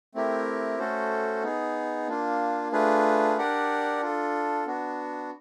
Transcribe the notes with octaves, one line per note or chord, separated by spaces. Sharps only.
A3 C4 E4 G4 A#4
A3 C#4 F#4 A4 C5
B3 D#4 G#4
A#3 D4 F4
A3 D4 F4 G#4 B4
D4 G4 A#4 D5 F#5
D4 F4 A4
B3 D4 F#4